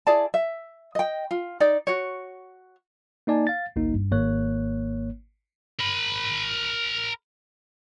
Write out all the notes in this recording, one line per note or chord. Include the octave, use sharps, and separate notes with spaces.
E4 G#4 D5 A5
E5
D#5 G5
F4
D#4 D5
F#4 C#5
A#3 D#4 D5 G#5 A5
F5 A6
G1 C2 A#3 D#4
G2
G#1 A#3 C#5 F#6
A#4 B5